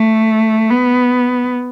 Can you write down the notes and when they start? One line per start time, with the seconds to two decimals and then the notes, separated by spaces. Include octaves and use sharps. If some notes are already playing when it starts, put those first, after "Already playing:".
Already playing: A3
0.71 B3